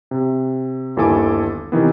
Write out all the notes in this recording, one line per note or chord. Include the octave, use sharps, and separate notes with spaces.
C3
G1 D#2 E4 A4 G#5 D6
C3 D#3 E3 B3